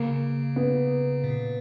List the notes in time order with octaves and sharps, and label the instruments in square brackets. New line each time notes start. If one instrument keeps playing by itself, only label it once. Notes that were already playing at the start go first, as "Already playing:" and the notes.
Already playing: [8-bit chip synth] C#3 [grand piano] A#3
[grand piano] B3
[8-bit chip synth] A#2